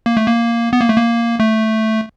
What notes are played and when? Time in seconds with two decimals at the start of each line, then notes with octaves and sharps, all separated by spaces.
0.06 A#3
0.17 A3
0.27 A#3
0.73 B3
0.81 A#3
0.89 A3
0.97 A#3
1.40 A3